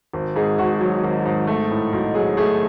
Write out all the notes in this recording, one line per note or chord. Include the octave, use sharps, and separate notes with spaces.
G#1
G#2 G#4
G#1 F#4
F#3
G#1
G#2
A3
A2
B1
F#3 G#4
A3 G#4